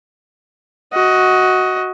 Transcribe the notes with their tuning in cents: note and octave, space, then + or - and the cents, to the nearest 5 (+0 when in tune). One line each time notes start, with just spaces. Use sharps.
F#4 +0 D#5 +20